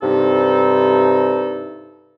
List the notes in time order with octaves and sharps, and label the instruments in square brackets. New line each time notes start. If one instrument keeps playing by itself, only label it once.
[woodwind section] G2 C3 D#4 A4